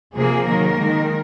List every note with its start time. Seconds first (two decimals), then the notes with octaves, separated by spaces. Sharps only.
0.16 C3 F3 A#3 G#4
0.47 D#3 F#3 A#3 A#4
0.78 D#3 G#3